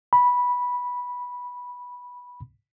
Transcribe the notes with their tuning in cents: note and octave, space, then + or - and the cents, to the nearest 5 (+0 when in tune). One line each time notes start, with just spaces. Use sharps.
B5 -10